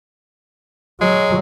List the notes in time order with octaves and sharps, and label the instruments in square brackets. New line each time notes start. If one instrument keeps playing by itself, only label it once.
[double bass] F#3 [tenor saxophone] G#3